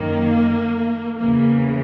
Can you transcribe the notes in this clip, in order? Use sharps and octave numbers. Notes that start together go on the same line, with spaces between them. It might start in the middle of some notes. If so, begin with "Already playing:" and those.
Already playing: F#2 D#3 A#3
E2 C#3 E3 A#3